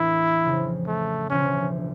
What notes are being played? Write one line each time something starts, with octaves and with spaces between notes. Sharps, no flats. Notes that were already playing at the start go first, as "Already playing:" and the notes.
Already playing: E2 A2 E3 A#3 D4 E4
F2 C#3 F3
A3
E1 D2 C#3 F3 C#4